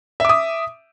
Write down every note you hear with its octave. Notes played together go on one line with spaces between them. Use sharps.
E5 D6 D#6